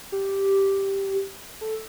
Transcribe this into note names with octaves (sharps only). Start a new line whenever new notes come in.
G4
A4